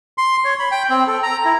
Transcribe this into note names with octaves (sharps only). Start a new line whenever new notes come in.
C6
C#5
B5
G5
C4
A4
A#5
E4